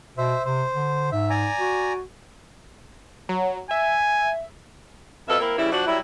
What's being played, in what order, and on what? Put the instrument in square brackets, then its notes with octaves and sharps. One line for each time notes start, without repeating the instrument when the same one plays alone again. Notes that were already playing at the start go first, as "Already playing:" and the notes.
[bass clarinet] B2 [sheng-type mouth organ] C5 E5
[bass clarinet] C3 [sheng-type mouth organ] C5
[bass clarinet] D3
[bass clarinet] G#2 [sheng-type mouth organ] E5
[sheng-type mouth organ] D5 G#5 A#5
[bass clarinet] F#4
[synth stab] F#3
[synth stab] E5 [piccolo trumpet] G#5
[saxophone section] F2 B2 A4 E5 F5
A#3 C4 E4 A#4
C#3 E3 G3 E4
F3 D4 F#4
F#3 G3 E4